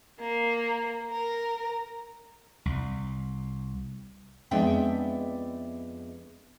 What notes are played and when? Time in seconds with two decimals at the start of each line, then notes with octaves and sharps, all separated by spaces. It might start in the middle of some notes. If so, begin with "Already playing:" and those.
0.20 A#3
1.10 A#4
2.65 C2
4.51 F2 G#3 B3 D4 E5 G5